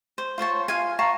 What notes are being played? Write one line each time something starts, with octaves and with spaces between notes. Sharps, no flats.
C5
F4 C5 C#5 A5
F4 F5 G#5
F5 A5 A#5 C#6